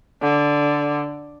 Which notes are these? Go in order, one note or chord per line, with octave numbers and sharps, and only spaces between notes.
D3